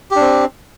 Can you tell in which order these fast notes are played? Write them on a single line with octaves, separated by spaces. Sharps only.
G4 D4 C4